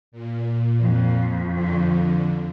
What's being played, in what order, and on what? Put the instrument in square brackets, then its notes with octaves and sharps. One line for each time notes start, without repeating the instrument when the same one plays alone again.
[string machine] A#2
[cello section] F2
[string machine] D3